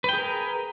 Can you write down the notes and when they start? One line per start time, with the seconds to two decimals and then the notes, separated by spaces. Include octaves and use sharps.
0.04 B4
0.09 G5
0.13 G#4
0.18 A#4